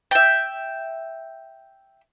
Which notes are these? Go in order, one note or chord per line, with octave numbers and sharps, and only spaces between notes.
E5 G5